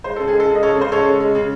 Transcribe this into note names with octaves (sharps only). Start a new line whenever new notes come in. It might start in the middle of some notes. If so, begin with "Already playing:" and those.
G#3 C5
C#3 A4
G#4
G#3
A4
C#3
D#5
G#3 A4 C#5
C#3 C5
G#3 A4 C#5
C#3
G#3
C#3